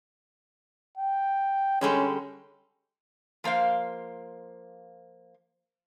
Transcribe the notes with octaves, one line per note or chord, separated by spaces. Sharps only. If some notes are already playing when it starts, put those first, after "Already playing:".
G5
D3 G3 G#3 C#4
F3 A#3 C5 F5